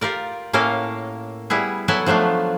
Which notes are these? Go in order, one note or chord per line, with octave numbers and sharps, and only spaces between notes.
F4 G4 A#4 D5
A2 A#3 C#4 A4 A#4 F5
G3 B3 E4 G#4
F#3 B3 E4 A4 F#5 G#5
F3 F#3 A3 D4 F4